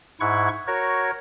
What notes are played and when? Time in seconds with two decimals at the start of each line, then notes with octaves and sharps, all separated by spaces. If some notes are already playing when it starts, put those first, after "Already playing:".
0.20 G#2 E4 F#5 C#6 G#6
0.67 F#4 A#4 C#5 G#6